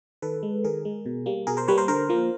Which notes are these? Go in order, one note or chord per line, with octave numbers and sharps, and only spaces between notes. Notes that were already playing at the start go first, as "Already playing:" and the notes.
D#3 A4 B4
G#3
D#3 G#4 A#4
G#3
B2
G3 A#3
B2 G#4 A#4
A#4 C5
G3 A#3 B4 C#5
A#4 C5
D3 A#4 C5
F3 A#3